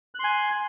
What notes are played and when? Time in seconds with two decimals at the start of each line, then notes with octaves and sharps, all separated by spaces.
0.15 F#6
0.19 C6
0.24 G#5